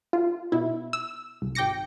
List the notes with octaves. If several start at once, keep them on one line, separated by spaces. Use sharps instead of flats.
F4
B2 E4
E6
C2
G#1 G5 D6 A#6 C#7